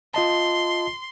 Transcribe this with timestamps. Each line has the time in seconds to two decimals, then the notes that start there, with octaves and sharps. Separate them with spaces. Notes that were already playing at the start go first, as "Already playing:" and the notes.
0.14 F4 D#5 A5 C6